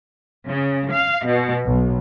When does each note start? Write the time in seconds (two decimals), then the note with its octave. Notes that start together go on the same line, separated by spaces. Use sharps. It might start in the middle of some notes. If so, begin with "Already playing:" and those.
0.48 C#3
0.92 F5
1.27 B2
1.65 B1